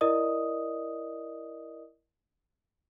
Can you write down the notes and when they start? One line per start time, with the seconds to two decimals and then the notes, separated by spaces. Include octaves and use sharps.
0.01 E4 A#4 D5 D#5 D#6